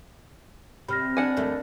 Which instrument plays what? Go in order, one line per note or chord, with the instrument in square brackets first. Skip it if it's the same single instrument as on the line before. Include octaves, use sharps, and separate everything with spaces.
[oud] C3 [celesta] B5 F6 A#6
[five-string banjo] D4 F#5 G#5
[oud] D#2 A3